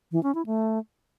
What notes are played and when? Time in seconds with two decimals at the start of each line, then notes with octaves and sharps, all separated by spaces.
0.12 E3
0.23 C#4
0.35 E4
0.46 A3